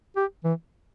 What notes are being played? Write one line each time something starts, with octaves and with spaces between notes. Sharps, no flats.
G4
E3